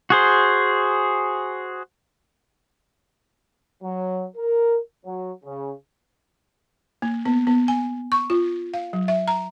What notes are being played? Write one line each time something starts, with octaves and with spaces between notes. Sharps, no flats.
F#4 G#4 C5
F#3
A#4
F#3
C#3
A#3
B3
B3
G#5
C#6
F4
F5
F#3
E5
A#5